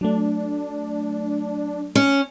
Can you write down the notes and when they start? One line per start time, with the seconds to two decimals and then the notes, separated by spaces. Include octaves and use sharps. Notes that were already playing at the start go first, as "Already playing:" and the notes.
0.01 F#3 A3 D4
1.95 C#4